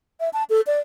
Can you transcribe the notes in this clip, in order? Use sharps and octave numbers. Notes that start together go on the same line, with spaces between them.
E5
A5
A4
D5